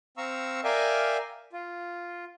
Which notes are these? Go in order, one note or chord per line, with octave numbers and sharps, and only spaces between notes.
C4 F5 A#5 C#6 E6
A#4 D5 E5 F5 G5 G#5
F4